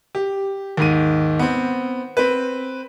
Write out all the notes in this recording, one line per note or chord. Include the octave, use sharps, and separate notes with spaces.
G4
D#2 G#2 D#7
B3 C4
C4 B4